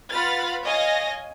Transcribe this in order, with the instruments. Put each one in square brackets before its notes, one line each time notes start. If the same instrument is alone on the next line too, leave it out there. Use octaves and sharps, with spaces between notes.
[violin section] F4 B4 F#5 B5 F6 A6
C#5 D#5 F5 G#5 A#6